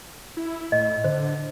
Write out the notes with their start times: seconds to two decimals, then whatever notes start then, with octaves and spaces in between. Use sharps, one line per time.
0.37 E4
0.72 A2 D#5
1.04 D3 C5